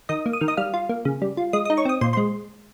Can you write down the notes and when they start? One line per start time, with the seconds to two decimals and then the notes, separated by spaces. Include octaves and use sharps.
0.09 D#3 D#5 D#6
0.26 A#3
0.33 D#6
0.41 D#3 F6
0.48 D#5 D#6
0.57 G3 F5 F6
0.74 F4
0.89 A#3
1.05 C#3
1.22 G3
1.37 F4
1.53 G#3 D#5 D#6
1.65 D#5 D#6
1.70 D#4
1.77 C#5 C#6
1.85 C4 D#5 D#6
2.01 A#2 C5 C6
2.13 C5 C6
2.17 G#3